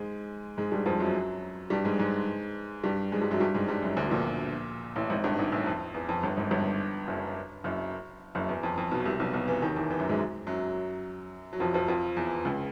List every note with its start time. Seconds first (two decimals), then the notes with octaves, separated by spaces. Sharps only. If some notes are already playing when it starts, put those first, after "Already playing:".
Already playing: G#2 G#3
0.57 G#2 G#3
0.72 G2 G3
0.86 F2 F3
1.00 F#2 F#3
1.70 G2 G3
1.85 G#2 G#3
1.99 G#2 G#3
2.84 G2 G3
3.12 G#2 G#3
3.21 G2 G3
3.31 F#2 F#3
3.40 G2 G3
3.54 G#2 G#3
3.68 G2 G3
3.82 F#2 F#3
3.97 D2 D3
4.06 B2
4.10 A#1 A#2
4.96 A1 A2
5.10 G#1 G#2
5.24 G1 G2
5.38 G#1 G#2
5.52 A1 A2
5.66 F2
5.94 E2
6.09 F2
6.23 G1 G2
6.37 G#1 G#2
6.51 G1 G2
7.08 F#1 F#2
7.64 F#1 F#2
8.35 F#1 F#2
8.49 E2
8.63 F2
8.78 F2
8.91 B1 B2
9.06 C2 C3
9.20 B1 B2
9.34 B1 B2
9.48 E2 E3
9.62 D#2 D#3
9.76 E2 E3
9.90 E2 E3
9.99 F#2 F#3
10.09 G#2 G#3
10.47 F#2 F#3
11.53 F#3
11.60 F2 F3
11.74 F2 F3
11.88 F2 F3
12.16 E2 E3
12.45 C#2 C#3